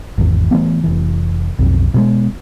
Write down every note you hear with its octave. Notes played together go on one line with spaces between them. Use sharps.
G#1 E2
E3 F3 A3 B3
F1 E3
B1 F2
B2 F3 G#3